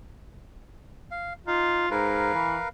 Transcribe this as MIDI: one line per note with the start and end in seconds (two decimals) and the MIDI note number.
1.11 1.33 77
1.47 1.86 63
1.47 1.89 65
1.91 2.33 44
1.91 2.69 70
1.91 2.69 71
1.91 2.69 77
2.34 2.57 52